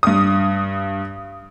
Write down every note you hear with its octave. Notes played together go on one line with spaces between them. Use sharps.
G2 D#6